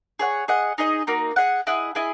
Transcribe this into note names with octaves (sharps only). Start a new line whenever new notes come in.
G#4 C#5 F#5
G#4 D#5 F#5
D#4 G#4 D#5
A#3 D#4 F#4
G#4 D#5 F#5
E4 G#4 D#5 F#5
E4 G#4 D#5 G#5